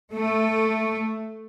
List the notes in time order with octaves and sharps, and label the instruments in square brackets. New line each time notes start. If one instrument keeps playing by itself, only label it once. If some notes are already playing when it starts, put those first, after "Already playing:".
[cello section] A3